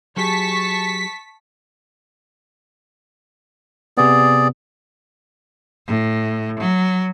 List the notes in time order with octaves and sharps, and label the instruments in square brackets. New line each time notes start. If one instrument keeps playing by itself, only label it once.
[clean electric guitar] F#3 G4 G#4 [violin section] A5 C#6 [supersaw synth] B6
[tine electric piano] C3 B3 [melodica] G#4 D5
[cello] A2
F#3